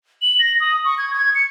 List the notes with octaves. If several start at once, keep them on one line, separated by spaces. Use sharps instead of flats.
F#7
A#6
D#6
C#6
G#6
G#6
C#7